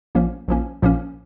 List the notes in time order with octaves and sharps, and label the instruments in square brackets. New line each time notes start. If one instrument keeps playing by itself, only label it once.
[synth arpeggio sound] A#1 A#2 F3 A#3 C#4
A#1 A#2 F3 A#3 C#4
A#1 A#2 F3 A#3 C#4